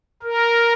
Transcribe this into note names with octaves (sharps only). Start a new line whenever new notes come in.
A#4